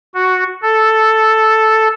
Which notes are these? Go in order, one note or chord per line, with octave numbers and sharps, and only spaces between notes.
F#4
A4